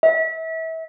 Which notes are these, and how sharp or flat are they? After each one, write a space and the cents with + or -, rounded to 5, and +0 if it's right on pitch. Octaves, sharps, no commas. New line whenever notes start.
E5 -30